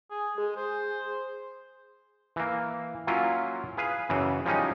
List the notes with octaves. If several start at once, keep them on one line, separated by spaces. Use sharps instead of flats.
G#4
G#3 G#4
C5
E3 A#3
F#3 A#3 C#4 E4 F4
G#4 B4 F5
F#2 C#3 E3
F3 G3 G#3 C#4 D#4